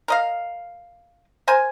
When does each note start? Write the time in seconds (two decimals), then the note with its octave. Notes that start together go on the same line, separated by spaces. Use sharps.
0.08 A#4 D#5 F5
1.48 A#4 C5 G#5